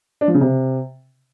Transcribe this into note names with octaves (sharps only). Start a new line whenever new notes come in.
D4
F3
C#3
C3